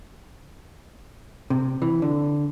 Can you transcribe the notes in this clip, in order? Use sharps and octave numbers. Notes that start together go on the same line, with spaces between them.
C3
E3
D3